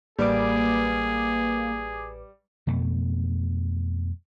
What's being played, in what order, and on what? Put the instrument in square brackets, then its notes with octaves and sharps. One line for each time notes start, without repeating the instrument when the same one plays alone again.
[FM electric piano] A1 B4 D6 [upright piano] G3 [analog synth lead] A#3 [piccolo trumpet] G#4
[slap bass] F2 B2 A3